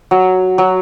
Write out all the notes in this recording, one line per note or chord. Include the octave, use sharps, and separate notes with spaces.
F#3
F#3